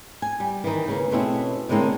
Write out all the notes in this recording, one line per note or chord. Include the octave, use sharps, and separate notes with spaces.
G#5
G3
D#3 E3
C#3 A#3
B2 A3 C4 C#4 E4
A2 D3 G#3 A#3 C4 E4